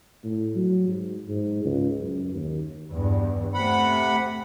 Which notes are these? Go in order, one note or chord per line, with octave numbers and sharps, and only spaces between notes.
A2
F#3
G#2
G#2
C#2
F#2
D#2
E2 G2
C3 A3 C4 F#5 B5